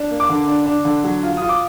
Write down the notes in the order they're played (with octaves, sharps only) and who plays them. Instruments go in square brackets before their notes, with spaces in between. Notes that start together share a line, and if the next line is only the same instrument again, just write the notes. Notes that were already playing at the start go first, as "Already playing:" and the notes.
Already playing: [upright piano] D4
A#3
D6
D3
D4
D4
D3
F#3
F4
F4 D#6
D6